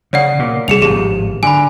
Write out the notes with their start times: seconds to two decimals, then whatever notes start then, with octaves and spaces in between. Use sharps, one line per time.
0.13 C#3 C#5 D5 F#5
0.39 A#2
0.68 C2 G#4 C#7 F7
0.82 G#1 A2 F3 G4 G#4
1.43 D3 G#5 B5